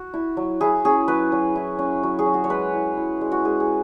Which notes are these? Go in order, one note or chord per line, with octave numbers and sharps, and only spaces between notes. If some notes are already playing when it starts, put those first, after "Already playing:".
Already playing: F#4
E4
F#3
E4 G#4
C#4 G#4
F#3 B4
F#3
E4
C#4
F#3
G#4
F#3
F#4
C#5
G#3 B4
E4
E4
G#3
F#4
G#3 G#4
G#4